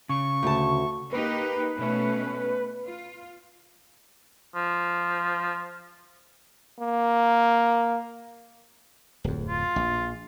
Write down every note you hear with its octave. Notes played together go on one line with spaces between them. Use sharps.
C#3 C#6
D2 A5
A#3 D#4 G4 B4
B2 A3 C#4
F4
F3
A#3
D1 F2
F4
A#1